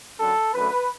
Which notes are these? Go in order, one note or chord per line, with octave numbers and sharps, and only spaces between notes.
F#2 D3 F#3 A4
F#2 D3 A3 B4